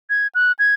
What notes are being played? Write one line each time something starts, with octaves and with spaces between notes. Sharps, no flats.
G#6
F#6
G#6